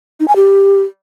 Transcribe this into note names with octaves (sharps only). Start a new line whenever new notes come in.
D#4
G#5
G4